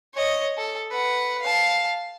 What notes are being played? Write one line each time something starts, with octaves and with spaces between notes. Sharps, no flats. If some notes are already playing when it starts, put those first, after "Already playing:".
C#5 D#5
A4
B4 F#5
F5 A5